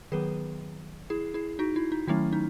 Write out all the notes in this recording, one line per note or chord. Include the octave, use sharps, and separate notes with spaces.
D#3 F#3 B3 G#4 B4
E4 G#4
E4 G#4
D#4 F#4
E4
D#4
D#3 F#3 A3 C#4 E4
D#4